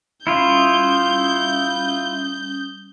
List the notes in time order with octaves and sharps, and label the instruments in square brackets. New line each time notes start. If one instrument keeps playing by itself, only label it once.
[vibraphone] G3 C#4 D#6 [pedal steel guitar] E4 F4 [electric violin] G6